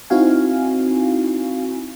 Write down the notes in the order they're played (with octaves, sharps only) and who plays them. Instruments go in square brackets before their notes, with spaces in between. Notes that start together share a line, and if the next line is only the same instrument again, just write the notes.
[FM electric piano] C4 D#4 E4 F#4 F5 G#5